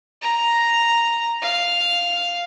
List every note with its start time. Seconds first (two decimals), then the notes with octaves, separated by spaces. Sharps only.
0.21 A#5
1.42 F5